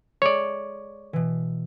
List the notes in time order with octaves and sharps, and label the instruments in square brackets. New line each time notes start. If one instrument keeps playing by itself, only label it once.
[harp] G#3 A4 E7 [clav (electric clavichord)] C#5 D5
[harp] B2 E3